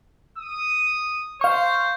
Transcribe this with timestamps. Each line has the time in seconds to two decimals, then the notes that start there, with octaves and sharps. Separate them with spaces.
0.38 D#6
1.41 C5 F5 C#6